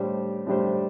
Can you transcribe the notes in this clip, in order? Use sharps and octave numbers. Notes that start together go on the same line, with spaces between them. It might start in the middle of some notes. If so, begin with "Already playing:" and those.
Already playing: A2 G3 D4 G4 C5
A2 G3 D4 G4 C5